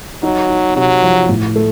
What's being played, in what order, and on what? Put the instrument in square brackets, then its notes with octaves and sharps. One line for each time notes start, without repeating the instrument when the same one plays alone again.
[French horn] F#3 [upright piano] D#4
[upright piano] D#4
[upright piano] C3 [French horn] F#3
[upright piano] F3
A2
A3